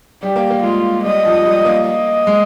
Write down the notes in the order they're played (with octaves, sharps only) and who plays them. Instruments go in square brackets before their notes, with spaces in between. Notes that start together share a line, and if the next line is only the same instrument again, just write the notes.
[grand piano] G3 [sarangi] G4
[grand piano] A#3
A#3
[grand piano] G#3 [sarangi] F4
[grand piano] G3 [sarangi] D#5
[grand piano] F3
G3
A#3
[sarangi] D#5
[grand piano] G#3